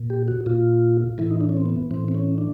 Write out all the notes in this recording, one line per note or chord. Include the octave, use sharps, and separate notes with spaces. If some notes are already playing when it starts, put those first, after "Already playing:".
Already playing: A#2
G4
F#4
A#2 F4
A2 E3 E4
D#4
D4
C#4
C4
B3
A2 E3 C4
C4
C#4
D4